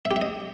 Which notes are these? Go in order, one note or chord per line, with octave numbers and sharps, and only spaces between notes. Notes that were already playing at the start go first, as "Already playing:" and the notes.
E5
G4
E5
D#5